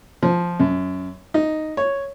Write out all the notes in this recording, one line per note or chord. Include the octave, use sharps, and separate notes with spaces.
F3
F#2
D#4
C#5